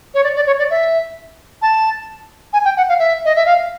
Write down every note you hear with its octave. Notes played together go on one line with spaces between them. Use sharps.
C#5
D5
D5
C#5
D5
E5
A5
G#5
G5
F#5
F5
E5
D#5
E5
F5